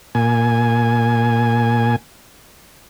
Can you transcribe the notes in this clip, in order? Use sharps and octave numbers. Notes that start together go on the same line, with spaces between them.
A#2 G#5